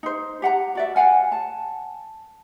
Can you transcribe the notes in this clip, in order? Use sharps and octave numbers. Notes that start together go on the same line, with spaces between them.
D#4 C5
G4 F#5 G5 A#5
F#4 D5 E5
C#5 F5 F#5 G#5
A5